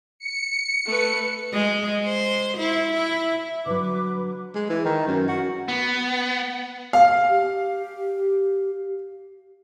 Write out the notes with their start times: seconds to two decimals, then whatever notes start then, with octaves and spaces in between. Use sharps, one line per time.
0.19 C#7
0.86 A3 B4
1.54 G#3
2.04 C5
2.58 E4
2.93 E4
3.66 D3 F#3 B4 D6
4.55 G#3
4.70 E3
4.85 D#3
5.08 F#2
5.28 F#4
5.68 B3
6.93 F5
7.29 G4